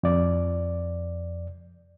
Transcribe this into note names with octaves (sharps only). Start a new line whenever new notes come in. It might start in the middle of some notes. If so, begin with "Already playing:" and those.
F2 D5